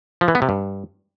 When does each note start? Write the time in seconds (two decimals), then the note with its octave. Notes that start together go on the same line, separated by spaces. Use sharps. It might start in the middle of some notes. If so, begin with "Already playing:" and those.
0.21 F3
0.28 E3
0.35 B3
0.42 C3
0.49 G2